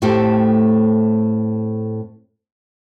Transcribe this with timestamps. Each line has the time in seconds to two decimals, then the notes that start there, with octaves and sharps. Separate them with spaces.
0.02 A2 A3 C4 G4 A4